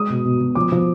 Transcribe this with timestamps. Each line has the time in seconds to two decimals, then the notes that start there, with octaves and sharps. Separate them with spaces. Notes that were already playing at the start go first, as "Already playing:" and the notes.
Already playing: G#3 D#6
0.10 B2
0.25 B2
0.40 B2
0.55 F3 D6
0.72 F3